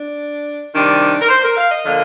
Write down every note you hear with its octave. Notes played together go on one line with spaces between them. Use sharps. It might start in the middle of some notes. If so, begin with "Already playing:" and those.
Already playing: D4
C3 D#3 G3 D4
A#4
C5
A#4
F5
D#5
D3 F3 A#3